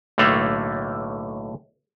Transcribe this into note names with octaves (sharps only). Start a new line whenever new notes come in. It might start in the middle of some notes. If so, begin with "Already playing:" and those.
B1 A2 D3 A3 A#3